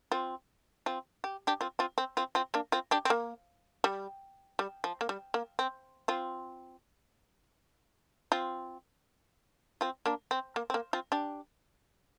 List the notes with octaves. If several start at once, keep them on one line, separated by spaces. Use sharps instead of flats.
C4 F4
C4 F4
G4
D4 G4
C4 F4
C4 F4
C4
C4 F4
C4 F4
A#3 D4
C4 F4
D4 G4
C4
A#3
G3
G3
F3
A#3
G3
A#3
C4
C4 F4
C4 F4
C4 F4
A#3 D4
C4
A#3
C4
A#3
C4 F4
D4 G4